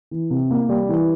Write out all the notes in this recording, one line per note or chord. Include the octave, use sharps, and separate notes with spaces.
E3
C3
A#3
G3
E3